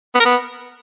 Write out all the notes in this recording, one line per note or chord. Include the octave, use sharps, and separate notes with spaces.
B3
A#4
B3